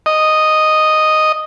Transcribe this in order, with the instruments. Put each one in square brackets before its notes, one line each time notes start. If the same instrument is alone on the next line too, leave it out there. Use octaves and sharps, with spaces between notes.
[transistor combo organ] D#5